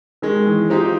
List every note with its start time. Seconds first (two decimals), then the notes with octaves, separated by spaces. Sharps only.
0.22 D#3 G#3
0.46 E3
0.70 F3 C4 D#4 G4